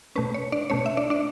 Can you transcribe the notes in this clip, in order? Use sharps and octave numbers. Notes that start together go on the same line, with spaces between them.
B2 A3 C#4 B4
C#5
D4 D5
B2 A3 C#4 C#5
E5
D4 D5
D4 D5